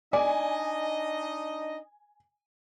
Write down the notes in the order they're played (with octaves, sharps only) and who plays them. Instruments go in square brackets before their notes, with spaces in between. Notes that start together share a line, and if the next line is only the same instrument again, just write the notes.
[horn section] D4 D#4 D#5 [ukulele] D5 [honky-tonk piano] G#5